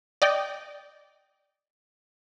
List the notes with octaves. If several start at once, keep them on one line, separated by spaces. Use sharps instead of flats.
D5 D#5 G5